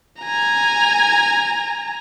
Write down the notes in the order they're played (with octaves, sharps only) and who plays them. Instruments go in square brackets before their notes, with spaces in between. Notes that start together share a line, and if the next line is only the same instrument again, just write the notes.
[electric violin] G#5 A#5